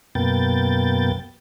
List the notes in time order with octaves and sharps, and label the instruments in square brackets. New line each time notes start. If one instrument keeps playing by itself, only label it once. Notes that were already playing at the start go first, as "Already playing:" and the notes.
[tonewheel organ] F#2 B2 A#3 B3 G5 A6